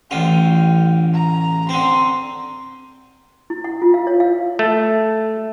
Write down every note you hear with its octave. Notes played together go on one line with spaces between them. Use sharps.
A1 D3 F4 G5
A#5
D3 C4 C6
E4
F#5
F4
F5
C#5
F5
A3